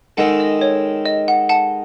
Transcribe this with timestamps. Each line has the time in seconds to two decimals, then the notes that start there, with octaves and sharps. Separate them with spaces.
0.17 D#3 G#3 D#4 A4 F#5
0.40 D#5
0.61 C#5
1.06 D#5
1.28 F#5
1.49 F#5 A5